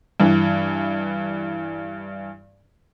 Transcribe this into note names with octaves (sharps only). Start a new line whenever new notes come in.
G2 E3